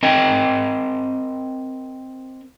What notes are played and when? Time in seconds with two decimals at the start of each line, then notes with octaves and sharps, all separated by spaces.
0.03 C4 A#4 D#5 G5